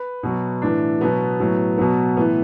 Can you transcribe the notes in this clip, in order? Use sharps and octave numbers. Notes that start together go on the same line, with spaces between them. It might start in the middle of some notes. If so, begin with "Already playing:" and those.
Already playing: B4
B2 F#3
A2 E3 D4
B2 F#3 B3
A2 F#3
B2 F#3 B3
A2 E3 B3